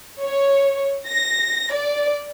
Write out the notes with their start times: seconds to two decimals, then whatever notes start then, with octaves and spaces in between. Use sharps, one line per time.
0.23 C#5
1.07 A#6
1.73 D5